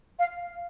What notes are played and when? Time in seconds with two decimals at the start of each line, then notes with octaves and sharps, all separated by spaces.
0.19 F5